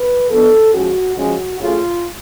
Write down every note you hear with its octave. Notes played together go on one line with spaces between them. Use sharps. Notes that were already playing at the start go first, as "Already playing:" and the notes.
Already playing: B4
F3 B3 D4 A4
F3 G#3 C#4 F#4
C#3 F3 G#3 C#4 F#4
C#3 F#3 A3 C#4 F4